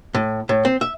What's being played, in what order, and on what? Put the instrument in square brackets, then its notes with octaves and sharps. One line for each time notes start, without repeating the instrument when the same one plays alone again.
[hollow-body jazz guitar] A2
A2
C4
E5